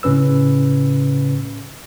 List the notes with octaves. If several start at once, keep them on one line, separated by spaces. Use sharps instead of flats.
A2 C#3 C#4 B4 E6